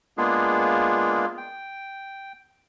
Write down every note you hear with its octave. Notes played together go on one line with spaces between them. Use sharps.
G#3 A#3 B3 D4 F4 G#4
G5